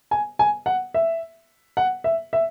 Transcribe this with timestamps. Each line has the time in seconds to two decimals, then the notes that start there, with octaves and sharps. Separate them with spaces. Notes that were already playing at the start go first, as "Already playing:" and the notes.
0.11 G#5
0.39 G#5
0.66 F#5
0.94 E5
1.77 F#5
2.04 E5
2.33 E5